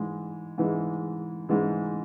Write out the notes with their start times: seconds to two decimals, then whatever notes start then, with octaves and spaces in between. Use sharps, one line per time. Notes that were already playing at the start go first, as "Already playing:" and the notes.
Already playing: G#2 E3 G#3
0.58 G#2 E3 G#3
1.49 G#2 E3 G#3